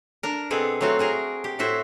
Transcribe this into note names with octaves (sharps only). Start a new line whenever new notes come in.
D4 A#4
B2 B3 C4 G#4 A4
F#3 A3 C4 F4 F#4
F#4 G#4 A#4
G4
A2 E4 F#4 C5 E5